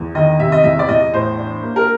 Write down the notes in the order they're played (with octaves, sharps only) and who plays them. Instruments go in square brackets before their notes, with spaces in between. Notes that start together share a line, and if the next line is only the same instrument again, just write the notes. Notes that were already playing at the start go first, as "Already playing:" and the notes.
Already playing: [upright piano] E2
D#3 D#5
C3 E5
D#5
E2 E5
D5
E2 D#5
A2 C5
D4
A#3
A#4